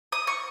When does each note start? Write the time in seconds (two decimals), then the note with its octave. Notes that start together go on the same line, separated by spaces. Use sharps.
0.12 D#6
0.27 C#6